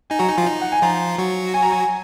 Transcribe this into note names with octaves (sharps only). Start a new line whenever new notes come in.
D#4 G#5
F#3 F#4 A#5
D#4 G#5
F3 F4
D#4
F#5
G#5
F3 F4 A#5
F#3 F#4
G#5
A#5
G#5